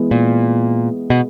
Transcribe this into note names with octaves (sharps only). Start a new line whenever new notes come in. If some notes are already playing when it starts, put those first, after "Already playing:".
Already playing: E3 G#3 B3
A#2
B2